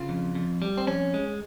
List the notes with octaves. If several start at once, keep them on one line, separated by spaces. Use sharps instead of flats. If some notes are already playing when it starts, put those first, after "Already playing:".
Already playing: C#3 F4
F2
F2
G3
C4
F2 C#4
G#3